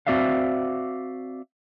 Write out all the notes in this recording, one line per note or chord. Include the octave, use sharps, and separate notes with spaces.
C4 F#4 D5 E5 F5